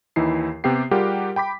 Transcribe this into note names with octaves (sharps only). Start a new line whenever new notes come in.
D#2 E3 D#4 E4 C7
C3 B3 G4 G5 C7
G3 F4 G4 G#4 A#4 F#5
G5 B5 D6 B6